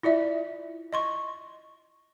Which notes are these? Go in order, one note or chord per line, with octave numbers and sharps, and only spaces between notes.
E4 F4 D5 E5
D#5 C6 C#6